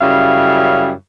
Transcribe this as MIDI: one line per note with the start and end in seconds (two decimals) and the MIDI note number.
0.01 0.91 42
0.01 0.91 49
0.01 0.91 55
0.01 0.91 64
0.01 0.91 77